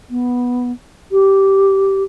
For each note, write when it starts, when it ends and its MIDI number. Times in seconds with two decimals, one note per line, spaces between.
0.10 0.72 59
1.12 2.03 67